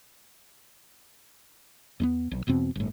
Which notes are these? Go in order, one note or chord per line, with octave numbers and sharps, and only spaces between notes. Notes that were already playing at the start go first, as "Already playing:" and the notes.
E2 A3 B3
B1
E1 E2 B2 C4
G1 A2